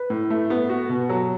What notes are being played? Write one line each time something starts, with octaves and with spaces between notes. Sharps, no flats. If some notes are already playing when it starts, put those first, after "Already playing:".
Already playing: B4
A2
A3
B3
F#4
B2
F#3